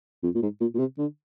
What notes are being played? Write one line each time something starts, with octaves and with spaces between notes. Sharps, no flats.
F2
A#2
G#2
A#2
A#2
C3
D3